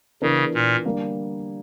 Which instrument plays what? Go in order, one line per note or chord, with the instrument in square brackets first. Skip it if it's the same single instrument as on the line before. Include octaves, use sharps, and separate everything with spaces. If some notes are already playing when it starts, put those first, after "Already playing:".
[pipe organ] C#3 [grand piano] E3 B3 D4 A#4
[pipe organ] A#2
[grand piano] D3 G3 A#3